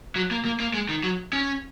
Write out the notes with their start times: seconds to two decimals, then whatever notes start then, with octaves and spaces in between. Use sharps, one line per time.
0.16 F#3
0.31 A#3
0.45 A#3
0.60 A#3
0.74 G#3
0.89 D#3
1.03 F#3
1.33 C#4